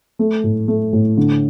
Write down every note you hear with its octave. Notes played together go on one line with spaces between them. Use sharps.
A3
A2
A3
A2
D3